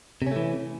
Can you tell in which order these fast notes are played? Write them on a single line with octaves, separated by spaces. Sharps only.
C3 C#4 A3 E3